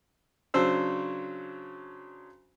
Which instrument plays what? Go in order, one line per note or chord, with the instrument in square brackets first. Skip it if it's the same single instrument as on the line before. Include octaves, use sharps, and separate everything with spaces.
[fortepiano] C#3 F#3 D4 C5 E6